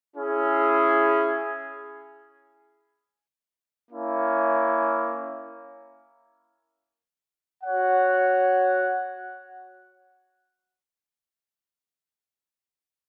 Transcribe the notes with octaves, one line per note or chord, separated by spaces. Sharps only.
C#4 E4 G#4
A#3 C#4 E4
F#4 C#5 F#5